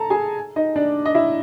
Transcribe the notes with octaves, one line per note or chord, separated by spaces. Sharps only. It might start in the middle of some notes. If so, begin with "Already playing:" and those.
Already playing: A4 A5 A#5
G#4 G#5
D#4 D#5
D4 D5
D#5
E4 E5